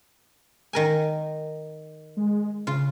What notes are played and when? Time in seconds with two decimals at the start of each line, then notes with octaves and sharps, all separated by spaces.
0.73 D#3 A#4 G#5
2.17 G#3
2.67 C#3 F4